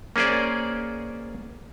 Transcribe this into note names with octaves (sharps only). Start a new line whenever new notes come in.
A#3 C#4 G#4 C5 D5